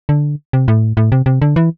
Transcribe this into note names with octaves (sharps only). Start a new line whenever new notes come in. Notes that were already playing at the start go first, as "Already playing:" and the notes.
D3
C3
A2
A2
C3
C3
D3
E3